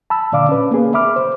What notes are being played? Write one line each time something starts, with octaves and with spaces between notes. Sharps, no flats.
A5 B5 E6
A#2 D3 D5 F5 D6
C#4 B4
A#3 B3 G#4 B4
E5 B5 D6 F6
C5